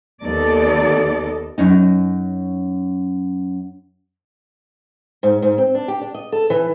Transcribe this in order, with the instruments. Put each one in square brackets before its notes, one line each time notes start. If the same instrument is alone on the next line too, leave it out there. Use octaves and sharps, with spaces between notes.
[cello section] D#2 B3 D#4 A4 D5
[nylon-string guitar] F#2 C#4 D#4
[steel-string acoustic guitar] G#2
G#2
C4
D4
G4
D4
D#5
A4
E3